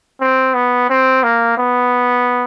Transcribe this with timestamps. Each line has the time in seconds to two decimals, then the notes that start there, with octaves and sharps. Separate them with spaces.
0.21 C4
0.54 B3
0.89 C4
1.23 A#3
1.57 B3